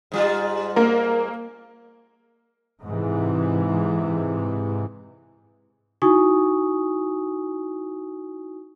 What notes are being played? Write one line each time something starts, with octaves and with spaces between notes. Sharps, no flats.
G#2 G3 F4
A#3 A#4
G#2 C3 E3
D#4 E4 F#4 G#5 C#6 D#6